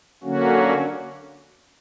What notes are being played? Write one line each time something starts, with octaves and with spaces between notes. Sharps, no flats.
D3 F#3 A#3 C#4 F#4